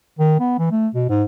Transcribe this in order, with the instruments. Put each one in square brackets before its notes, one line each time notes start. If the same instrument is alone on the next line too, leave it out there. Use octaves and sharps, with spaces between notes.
[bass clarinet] D#3
B3
E3
A3
B2
G#2